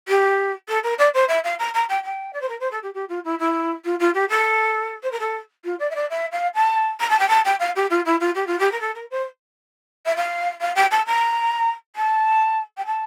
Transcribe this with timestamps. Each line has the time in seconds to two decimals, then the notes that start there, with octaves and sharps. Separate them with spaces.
0.08 G4
0.68 A4
0.83 A#4
0.98 D5
1.14 C5
1.28 E5
1.44 F5
1.59 A#5
1.74 A#5
1.89 G5
2.04 G5
2.33 D5
2.41 C5
2.48 A#4
2.60 C5
2.71 A4
2.83 G4
2.94 G4
3.09 F4
3.24 E4
3.39 E4
3.84 F4
3.99 F4
4.14 G4
4.29 A4
5.03 C5
5.11 A#4
5.20 A4
5.64 F4
5.79 D5
5.90 E5
5.95 D5
6.10 E5
6.32 F5
6.54 A5
7.00 A#5
7.09 A5
7.19 G5
7.28 A5
7.45 G5
7.60 F5
7.75 G4
7.90 F4
8.05 E4
8.20 F4
8.35 G4
8.47 F4
8.59 G4
8.71 A#4
8.80 A4
8.95 A#4
9.10 C5
10.06 E5
10.16 F5
10.61 F5
10.75 G5
10.91 A5
11.06 A#5
11.96 A5
12.77 G5
12.86 A5